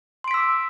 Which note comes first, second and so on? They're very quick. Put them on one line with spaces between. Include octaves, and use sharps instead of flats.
C6 D7 B6 E6 D6